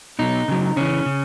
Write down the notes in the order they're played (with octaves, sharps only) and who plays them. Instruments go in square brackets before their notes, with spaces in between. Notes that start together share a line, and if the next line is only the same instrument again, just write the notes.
[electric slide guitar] B2 F#3 D#4
C#3 F#3
C#3 E3 C#4
C#3